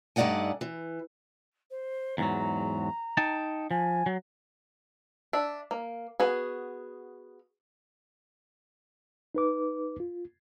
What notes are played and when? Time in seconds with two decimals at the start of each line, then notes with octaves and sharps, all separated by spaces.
0.16 G2 A3 D#4 D5 F#5 G#5
0.61 E3
1.71 C5
2.18 E2 G#2 F#3 A#5
3.17 D#4 G5 A5
3.71 F3 G#5
4.06 F#3
5.33 D4 E5
5.71 A#3
6.20 B3 F#4 G#4
9.35 D#4 B4 D6
10.00 F4